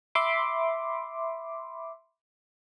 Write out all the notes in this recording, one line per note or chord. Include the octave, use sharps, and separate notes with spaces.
E5 B5 C6 D6